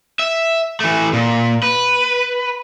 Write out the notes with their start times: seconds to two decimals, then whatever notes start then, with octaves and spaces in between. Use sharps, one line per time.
0.19 E5
0.80 E3 A3
1.13 A#2
1.63 B4